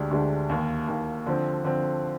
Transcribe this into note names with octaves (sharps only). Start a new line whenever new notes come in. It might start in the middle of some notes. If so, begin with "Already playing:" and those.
Already playing: D2 D3 G#3 D4 G4
D2 D3 G#3 D4 G4
D#2 D#3 A#3
D#2 D#3 A#3
D3 F3 C4
D3 F3 C4